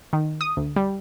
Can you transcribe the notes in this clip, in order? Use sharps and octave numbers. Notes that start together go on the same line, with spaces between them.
D#3
D#6
D2
G3